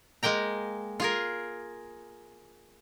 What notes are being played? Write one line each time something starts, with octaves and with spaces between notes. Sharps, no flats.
G#3 A#3 G5 A#5
F4 G#4 A#4